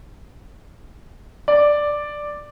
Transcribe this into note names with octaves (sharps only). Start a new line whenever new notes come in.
D5